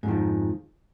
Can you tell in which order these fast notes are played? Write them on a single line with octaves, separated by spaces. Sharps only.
G#2 F2 D#3 F3